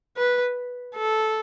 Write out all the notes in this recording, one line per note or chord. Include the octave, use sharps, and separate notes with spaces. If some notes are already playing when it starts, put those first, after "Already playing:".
B4
A4